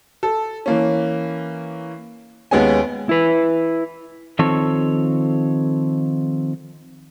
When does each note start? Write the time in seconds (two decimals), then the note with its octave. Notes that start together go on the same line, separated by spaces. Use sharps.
0.23 A4
0.66 E3 A#3 C#4
2.51 D#2 G#3 B3 C#4 G#5
3.09 E4 B4
4.39 D#3 F3 C4 A4 C#5